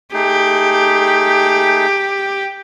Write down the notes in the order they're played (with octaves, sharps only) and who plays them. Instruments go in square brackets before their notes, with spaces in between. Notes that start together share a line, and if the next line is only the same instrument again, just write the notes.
[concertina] A3 D#4 G#4 [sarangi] G4